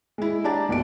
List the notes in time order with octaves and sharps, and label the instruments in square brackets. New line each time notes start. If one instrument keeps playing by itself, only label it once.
[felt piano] G#3 E4
D4 G4 D5 A5 A#5
F#1 B1 B2 D7